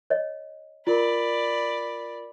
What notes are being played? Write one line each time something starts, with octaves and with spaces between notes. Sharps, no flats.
C#5 D#5
F4 A#4 D5 B5